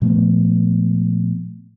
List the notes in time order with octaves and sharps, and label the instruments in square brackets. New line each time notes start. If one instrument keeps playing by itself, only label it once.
[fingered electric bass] A#2 F3 A3 B3